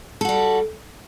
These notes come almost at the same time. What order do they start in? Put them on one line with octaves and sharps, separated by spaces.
A4 F#4 G3